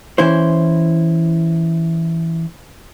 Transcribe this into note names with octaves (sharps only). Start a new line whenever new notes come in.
E3 C#4 E4 C5